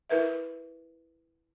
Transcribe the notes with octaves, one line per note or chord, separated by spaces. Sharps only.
E4 A#4 B4 E5